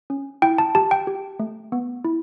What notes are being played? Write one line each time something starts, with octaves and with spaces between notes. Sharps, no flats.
C#4
E4 G5
A5
G4 A5
G5
G4
A3
B3
E4